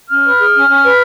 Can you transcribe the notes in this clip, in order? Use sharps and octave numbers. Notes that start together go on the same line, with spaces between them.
C#4 F6
B4
G#4
C#4
C#4
B4